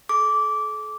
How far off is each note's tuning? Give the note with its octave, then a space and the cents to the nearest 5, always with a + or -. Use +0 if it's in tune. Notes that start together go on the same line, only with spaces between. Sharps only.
A4 -45 D6 -15